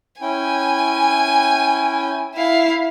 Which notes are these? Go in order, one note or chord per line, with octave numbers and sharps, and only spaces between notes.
C#4 E4 G5 G#5
E4 F5